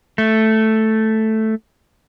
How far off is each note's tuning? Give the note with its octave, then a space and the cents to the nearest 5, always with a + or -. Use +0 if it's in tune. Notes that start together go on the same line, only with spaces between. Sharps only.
A3 +0